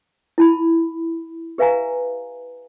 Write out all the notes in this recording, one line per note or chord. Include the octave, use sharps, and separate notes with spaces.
E4 A5 B5
G4 B4 E5 F5 G#5 A#5